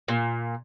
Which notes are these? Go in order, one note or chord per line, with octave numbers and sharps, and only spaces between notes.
A#2